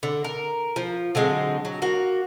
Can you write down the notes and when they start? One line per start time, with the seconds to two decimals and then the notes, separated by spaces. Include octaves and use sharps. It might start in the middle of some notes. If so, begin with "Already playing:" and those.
0.03 D3
0.24 A#4
0.76 F3
1.15 D3 F#3 G#3 C4
1.65 F#3
1.82 A#3 F#4